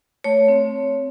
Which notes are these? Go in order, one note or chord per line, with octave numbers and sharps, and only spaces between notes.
A3 C#5
C4